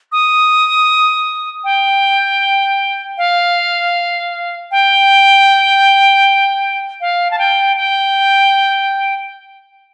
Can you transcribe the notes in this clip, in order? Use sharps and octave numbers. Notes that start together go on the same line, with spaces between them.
D#6
G5
F5
G5
F5
A5
G5
G5